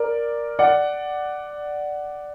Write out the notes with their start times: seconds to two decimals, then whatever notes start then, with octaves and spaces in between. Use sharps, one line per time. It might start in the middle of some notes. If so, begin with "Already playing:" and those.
Already playing: A#4 D5
0.59 D5 F#5